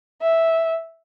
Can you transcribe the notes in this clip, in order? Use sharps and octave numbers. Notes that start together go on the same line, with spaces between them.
E5